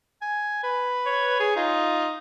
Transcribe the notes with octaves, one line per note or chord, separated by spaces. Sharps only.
G#5
B4
C#5
G#4
D#4 F4